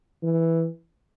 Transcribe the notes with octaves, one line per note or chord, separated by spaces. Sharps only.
E3